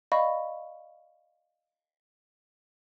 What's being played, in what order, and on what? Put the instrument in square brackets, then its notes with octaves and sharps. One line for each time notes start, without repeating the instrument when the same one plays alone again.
[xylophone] D5 D#5 F5 B5 C#6